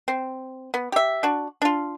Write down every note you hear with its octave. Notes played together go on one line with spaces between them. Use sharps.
C4
B3
G4 E5
D4 F#4
D4 F4